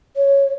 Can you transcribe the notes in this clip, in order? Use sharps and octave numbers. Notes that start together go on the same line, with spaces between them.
C#5